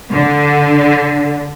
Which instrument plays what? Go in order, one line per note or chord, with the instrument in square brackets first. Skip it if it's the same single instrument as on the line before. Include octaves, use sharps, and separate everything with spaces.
[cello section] D3